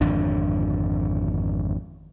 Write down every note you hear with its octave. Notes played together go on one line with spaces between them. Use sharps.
G#1 F2 D3 D4